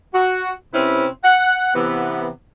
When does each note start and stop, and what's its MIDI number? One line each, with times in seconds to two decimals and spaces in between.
0.14 0.52 66
0.74 1.07 48
0.74 1.07 60
0.74 1.07 61
0.74 1.07 64
0.74 1.07 71
1.24 1.71 78
1.74 2.29 48
1.74 2.29 52
1.74 2.29 59